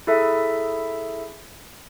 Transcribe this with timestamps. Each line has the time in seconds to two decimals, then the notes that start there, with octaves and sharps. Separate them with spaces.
0.07 E4 G#4 A4 E5 A#5